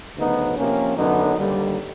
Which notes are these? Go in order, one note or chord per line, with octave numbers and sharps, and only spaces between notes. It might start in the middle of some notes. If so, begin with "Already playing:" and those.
D2 C#3 F#3 B3 D#4
C3 F3 A#3 C#4
F#2 D3 F#3 B3 D#4
D#2 D3 G3